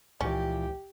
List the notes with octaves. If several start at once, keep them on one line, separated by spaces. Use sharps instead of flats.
C#2 A#2 E3 F3 C#4 G4